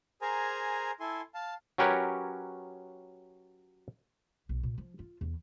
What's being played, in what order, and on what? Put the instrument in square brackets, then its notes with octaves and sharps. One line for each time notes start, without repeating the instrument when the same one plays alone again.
[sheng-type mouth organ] G#4 A#4 C5 G#5 A#5
E4 A4 G#5 C6
F5 A5
[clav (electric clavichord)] F#3 C#4 G4 A#4 B4 C#5
[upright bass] B1
A#2
F3
F4
E2